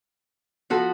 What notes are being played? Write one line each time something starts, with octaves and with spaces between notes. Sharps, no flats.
F3 B3 F#4 A4